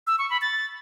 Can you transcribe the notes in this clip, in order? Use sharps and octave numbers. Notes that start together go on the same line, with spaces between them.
E6
C#6
B5
A6